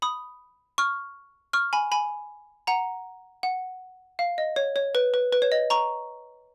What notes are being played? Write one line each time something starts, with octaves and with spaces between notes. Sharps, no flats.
B5 D#6
C#6 F6
C#6 F6
G#5 B5
G#5 B5
F#5 A#5
F#5
F5
D#5
C#5
C#5
B4
B4
B4
C#5
D#5
A#5 C#6